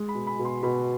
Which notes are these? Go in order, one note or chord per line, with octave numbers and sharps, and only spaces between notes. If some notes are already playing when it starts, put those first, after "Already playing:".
Already playing: G#3
B5
B2
B5
B2
C6
B2 B5